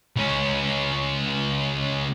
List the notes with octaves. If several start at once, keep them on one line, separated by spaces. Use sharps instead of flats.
C#2 C#4